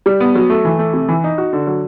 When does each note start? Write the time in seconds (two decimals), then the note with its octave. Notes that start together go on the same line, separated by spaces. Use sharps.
0.06 G3
0.20 B3
0.35 F#3
0.50 A3
0.65 E3
0.79 A3
0.93 C3
1.09 E3
1.24 D#4
1.38 F#4
1.53 D3
1.67 F#3